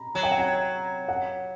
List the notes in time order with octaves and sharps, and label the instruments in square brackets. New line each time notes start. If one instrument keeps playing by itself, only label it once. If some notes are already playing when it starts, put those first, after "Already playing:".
Already playing: [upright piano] A#5 B5
[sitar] F#3 [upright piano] A#5
[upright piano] G5
F#5
G5
F#5